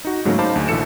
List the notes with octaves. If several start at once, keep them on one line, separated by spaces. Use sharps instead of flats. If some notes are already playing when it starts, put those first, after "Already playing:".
D#4 F#4
G#2 C#3 F#3 A3 A#3
D#4 C5 F5 A5 B5 D6
D2
A#1 D3 E3 A4 C#7 E7